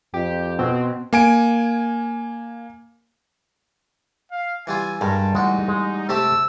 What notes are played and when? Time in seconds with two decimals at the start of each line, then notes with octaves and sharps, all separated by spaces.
0.14 F2 G4
0.59 B2 C4 F#4
1.13 A#3 G#5 D7
4.32 F5
4.67 E3 G3 F4 G#5
5.01 G2 G3 G#3 A#4 A5
5.35 A1 G#3 D#4 F#4
5.68 G#3
6.09 C3 A3 G4 E6